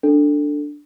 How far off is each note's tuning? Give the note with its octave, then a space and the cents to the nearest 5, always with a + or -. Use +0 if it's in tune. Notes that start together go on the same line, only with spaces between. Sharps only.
D4 +0 A4 +15